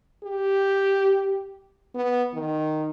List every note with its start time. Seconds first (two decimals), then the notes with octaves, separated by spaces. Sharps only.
0.23 G4
1.94 B3
2.34 D#3